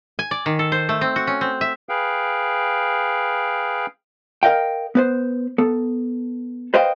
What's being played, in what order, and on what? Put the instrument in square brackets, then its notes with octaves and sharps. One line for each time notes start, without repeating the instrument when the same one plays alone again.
[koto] G#5
D5
D#3
A4
C5
A3
C4
F#4
C#4
C4
E5
[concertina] G#4 B4 F5 G5
[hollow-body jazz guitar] A#4 B4 D#5 F5 G5
B3 B4 C5
B3 A4
B4 C5 D#5 F5 G5